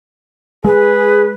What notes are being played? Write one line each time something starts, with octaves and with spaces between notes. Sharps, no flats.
G#3 G#4 B4